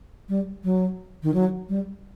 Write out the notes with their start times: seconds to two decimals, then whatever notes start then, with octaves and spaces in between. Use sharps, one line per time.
0.29 G3
0.64 F#3
1.23 D#3
1.34 F#3
1.69 G3